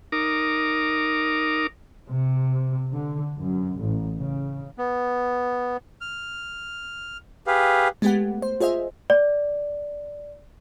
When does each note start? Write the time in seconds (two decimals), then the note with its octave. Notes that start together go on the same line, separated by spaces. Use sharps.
0.12 D#4 A#4 D6
2.09 C3
2.91 D3
3.36 F#2
3.79 A1
4.17 C#3
4.78 B3
6.01 F6
7.47 G4 G#4 B4 F5
8.02 G#3 A3 B3 G4 B4 F#5
8.42 C5
8.60 F4 G#4 C5 D#5 E5
9.10 D5